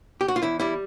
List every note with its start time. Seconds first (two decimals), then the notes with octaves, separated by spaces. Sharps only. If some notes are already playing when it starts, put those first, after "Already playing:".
0.21 G4
0.28 F#4
0.36 F4
0.43 E2 E4
0.60 G3 E4